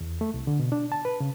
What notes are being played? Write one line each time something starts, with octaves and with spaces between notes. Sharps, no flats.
E2
A3
C2
D3
B2
D4
A5
B4
C#3